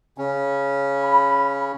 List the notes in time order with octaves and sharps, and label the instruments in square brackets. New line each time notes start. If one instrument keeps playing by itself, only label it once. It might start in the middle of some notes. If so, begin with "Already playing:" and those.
[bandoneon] C#3 C#4
[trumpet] B5